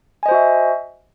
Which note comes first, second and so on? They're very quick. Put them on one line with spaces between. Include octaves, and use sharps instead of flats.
G#5 D#5 C5 F#4 E5